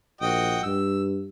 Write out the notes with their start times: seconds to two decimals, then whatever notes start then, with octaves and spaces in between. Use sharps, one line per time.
0.21 A#1 F#4 D#5 G5
0.63 G2 E6